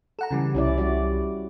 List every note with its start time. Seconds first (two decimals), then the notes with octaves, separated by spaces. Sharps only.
0.19 A4 F#5 A#5
0.31 C#3 E3 G3
0.55 C2 C#4 E4 D5
0.78 G3 F#4 D5